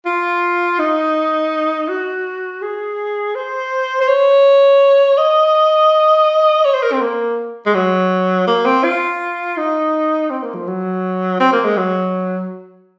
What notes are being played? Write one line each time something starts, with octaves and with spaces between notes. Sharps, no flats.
F4
D#4
F#4
G#4
C5
C5
C#5
D#5
C#5
C5
A#4
C4
A#3
G#3
F#3
A#3
C4
F4
D#4
C4
A#3
F3
F#3
C4
A#3
G#3
F#3